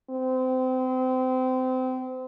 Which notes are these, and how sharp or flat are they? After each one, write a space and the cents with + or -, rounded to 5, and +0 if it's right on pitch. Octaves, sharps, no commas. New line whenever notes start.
C4 -30